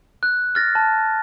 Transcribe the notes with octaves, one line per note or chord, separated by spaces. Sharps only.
F#6
F6 A6 A#6
A5